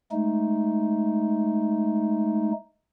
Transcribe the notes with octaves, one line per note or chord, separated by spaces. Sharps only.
G#3 A3 D#4